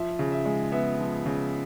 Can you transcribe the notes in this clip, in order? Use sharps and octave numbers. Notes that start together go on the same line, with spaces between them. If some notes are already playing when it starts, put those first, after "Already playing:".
Already playing: F3 E5
C#3
E5
G#3
B3 E5
F3
C#3